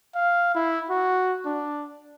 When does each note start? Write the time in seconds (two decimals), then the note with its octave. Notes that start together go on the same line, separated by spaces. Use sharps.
0.15 F5
0.55 E4
0.90 F#4
1.45 D4